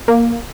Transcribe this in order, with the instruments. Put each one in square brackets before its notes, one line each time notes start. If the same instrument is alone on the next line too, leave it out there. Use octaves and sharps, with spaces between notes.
[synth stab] A#3